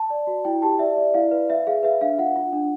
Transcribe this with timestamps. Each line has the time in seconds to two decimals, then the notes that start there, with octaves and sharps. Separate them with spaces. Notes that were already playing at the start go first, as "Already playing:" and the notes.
Already playing: A5
0.10 D5
0.27 F#4
0.45 E4 G5
0.62 G4 A5
0.79 D5 E5
0.97 D5
1.14 E4 F5
1.31 B4
1.49 B4 E5
1.67 G#4 F5
1.83 B4 E5
2.01 D4 F5
2.18 F4 F#5
2.36 F4
2.52 D4